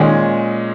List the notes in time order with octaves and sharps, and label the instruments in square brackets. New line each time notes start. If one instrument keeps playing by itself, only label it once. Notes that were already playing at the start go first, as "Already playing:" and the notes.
Already playing: [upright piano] A#2 G#3 C#4 G#4 [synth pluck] D#3